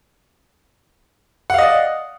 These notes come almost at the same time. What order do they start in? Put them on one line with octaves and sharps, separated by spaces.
F#5 F5 D#5 D5